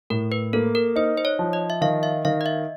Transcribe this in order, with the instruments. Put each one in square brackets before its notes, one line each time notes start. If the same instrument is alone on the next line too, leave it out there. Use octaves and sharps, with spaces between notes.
[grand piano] A2 [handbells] A#4
[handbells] B4
[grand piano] A#3 [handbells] A4
[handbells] A#4
[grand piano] D#4 [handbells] C5
[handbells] C5
C#5
[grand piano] F3
[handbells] D#5
E5
[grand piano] D#3 [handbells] F5
[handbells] E5
[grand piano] D#3 [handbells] F5
[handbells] D#5
E5